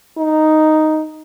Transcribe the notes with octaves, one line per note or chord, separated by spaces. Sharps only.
D#4